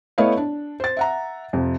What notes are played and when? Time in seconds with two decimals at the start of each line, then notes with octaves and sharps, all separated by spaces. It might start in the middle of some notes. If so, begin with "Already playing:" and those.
0.18 A3 B3 E4 C#5 D#5 F5
0.37 D4
0.80 C5 A6
0.97 E5 F#5 A#5
1.53 F2 C3